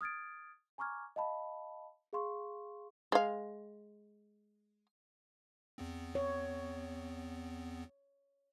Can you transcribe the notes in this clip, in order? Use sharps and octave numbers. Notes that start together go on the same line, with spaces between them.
D#6 F6 G#6 A6 D7
G#5 A#5 C#6 D6 F6 G#6
D#5 F5 A5 B5
G#4 F5 C6 C#6
G#3 F5
E2 B3 C4
C#5